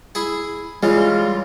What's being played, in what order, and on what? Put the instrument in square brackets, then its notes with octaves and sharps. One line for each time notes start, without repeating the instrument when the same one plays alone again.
[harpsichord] E4 G#4
[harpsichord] C#3 E3 [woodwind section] G3 [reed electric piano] G#3 [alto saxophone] F4